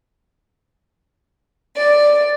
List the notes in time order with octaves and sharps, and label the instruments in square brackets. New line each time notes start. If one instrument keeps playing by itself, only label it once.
[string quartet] D5